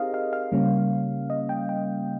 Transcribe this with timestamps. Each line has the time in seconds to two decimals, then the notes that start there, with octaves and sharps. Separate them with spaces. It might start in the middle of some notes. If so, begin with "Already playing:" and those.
Already playing: C4 D#4 G4 G#4 A#4 C5 D#5 F5
0.14 F5
0.33 F5
0.52 C#3 G3 A#3 C#4
1.30 D#5
1.49 G5
1.69 G5